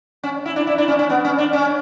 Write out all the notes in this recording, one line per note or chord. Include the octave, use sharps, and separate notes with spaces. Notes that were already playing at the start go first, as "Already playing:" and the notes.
C#4
E4
D4
E4
D4
C#4
C#4
B3
C#4
D4
C#4